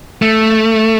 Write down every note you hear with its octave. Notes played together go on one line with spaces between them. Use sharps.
A3